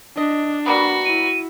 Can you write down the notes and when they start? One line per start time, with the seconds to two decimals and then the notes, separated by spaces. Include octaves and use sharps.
0.17 D4 D#5
0.66 G3 A#3 B3 F#4
1.05 E4 D#7